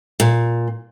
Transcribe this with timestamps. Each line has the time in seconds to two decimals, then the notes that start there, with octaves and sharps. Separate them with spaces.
0.20 A#2